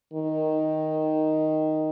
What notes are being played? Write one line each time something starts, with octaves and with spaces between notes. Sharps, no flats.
D#3